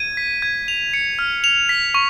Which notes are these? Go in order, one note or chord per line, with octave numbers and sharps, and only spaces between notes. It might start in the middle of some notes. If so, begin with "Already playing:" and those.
Already playing: G#6 D#7
B6
G#6
F7
C#7
F6
F7
B6
C#6